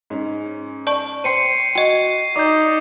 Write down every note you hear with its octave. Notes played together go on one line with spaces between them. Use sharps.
G#2 C#4
D5 A5 C#6
C5 G5 C6 C7 C#7 D#7
F#4 D#5 G5 C#6
D#4 D5 D6 G6